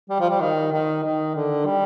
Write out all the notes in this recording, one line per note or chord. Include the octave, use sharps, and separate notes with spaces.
G3
F3
G3
D#3
D#3
D#3
D3
G3